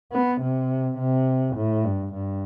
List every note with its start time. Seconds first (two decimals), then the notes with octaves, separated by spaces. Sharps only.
0.12 B3
0.41 C3
0.98 C3
1.56 A2
1.84 G2
2.13 G2